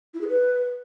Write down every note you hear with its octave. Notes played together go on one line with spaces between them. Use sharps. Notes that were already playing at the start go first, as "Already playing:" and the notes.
E4
G#4
B4